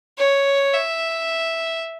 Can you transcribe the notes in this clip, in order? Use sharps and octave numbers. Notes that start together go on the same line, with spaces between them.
C#5
E5